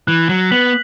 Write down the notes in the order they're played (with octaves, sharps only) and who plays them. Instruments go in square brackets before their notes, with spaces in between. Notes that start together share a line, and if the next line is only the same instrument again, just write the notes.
[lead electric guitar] E3 [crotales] F#6
[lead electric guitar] F#3
[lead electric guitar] B3 [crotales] B6 F#7